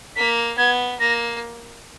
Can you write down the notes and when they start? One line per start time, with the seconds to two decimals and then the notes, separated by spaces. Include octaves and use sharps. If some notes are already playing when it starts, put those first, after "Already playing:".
0.16 A#3 B6
0.58 B3 G#6
1.00 A#3 A#6